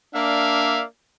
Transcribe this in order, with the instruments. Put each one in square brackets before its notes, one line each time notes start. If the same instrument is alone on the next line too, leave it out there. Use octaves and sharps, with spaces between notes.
[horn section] A#3 D4 D5 E5 F5